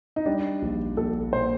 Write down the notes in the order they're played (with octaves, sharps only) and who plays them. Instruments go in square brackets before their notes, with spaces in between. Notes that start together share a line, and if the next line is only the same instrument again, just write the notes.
[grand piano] D#4
G3 D4
A#1
A#1 A4
A#2 C5